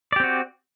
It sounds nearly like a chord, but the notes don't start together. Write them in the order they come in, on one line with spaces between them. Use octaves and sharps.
D5 G4 C4 F#4